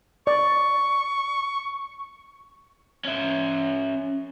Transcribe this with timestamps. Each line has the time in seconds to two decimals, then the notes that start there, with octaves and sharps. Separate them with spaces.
0.27 D5 C#6
3.04 C#4 E5